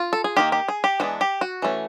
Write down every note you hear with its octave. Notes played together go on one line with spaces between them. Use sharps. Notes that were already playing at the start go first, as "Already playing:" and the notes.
Already playing: F4
A4
G#4
D#3 G3 A#3 G4
G4
G#4
G4
E3 G#3 B3 D4 F#4
G4
F#4
E3 A3 C#4